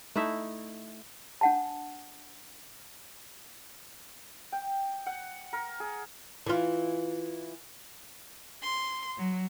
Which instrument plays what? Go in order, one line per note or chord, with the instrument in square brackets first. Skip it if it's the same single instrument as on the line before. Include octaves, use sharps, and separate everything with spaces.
[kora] A3 D#4 E4 E5
[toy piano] D4 F#5 A5
[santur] G5
F#5
A#4
G#4
[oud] E3 F4
[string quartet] C6
F#3